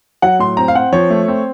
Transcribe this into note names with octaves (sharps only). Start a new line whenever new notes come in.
F#3 F#5
A2 C6
C4 A#5
F5
C4 F#5
F3 C#5
A3
C4